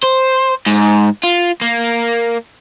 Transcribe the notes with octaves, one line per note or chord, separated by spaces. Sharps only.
C5
G#2
F4
A#3